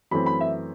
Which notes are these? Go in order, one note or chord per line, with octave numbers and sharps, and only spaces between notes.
F#2 E3 A3 C4 B5
B5
E5